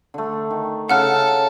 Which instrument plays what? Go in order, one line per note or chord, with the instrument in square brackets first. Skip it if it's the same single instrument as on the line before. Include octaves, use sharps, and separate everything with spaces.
[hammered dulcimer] D3 A3
D#3
[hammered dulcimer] C#3 E4 A#5 [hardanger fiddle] A4 [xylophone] F#5 F6 F#6